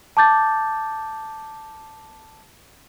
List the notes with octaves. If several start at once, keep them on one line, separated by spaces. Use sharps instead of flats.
A5 D6 G6 A6